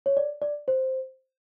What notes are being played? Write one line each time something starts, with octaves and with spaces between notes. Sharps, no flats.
C#5
D5
D5
C5